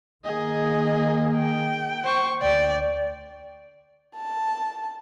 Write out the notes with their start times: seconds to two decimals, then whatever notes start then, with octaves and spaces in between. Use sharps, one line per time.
0.24 D#3 A#3 G#4 D#5
1.36 G5
2.04 C5 C#6
2.41 D2 D5 G5
4.16 A5